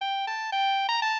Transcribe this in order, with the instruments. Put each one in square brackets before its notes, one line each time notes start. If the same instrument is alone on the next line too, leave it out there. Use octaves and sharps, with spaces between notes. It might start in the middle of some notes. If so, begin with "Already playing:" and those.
[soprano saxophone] G5
A5
G5
A#5
A5